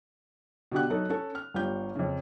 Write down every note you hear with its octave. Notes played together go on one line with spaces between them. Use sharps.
B2 D3 G4 F#6
F#2 D#4 A4
C#4 A4
F6
G1 G3 F4 G6
F2 C#3